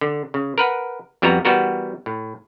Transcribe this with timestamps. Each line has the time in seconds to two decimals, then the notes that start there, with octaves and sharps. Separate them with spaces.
0.01 D3
0.34 C#3
0.58 A#4 B4 F#5
1.22 F2 G3 B3 F#4 A#5
1.45 E3 G3 B3 F#4 A#4
2.06 A2